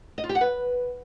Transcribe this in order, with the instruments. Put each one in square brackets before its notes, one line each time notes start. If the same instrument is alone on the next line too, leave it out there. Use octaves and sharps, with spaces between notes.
[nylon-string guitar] D#5
F4
G4
F#5
B4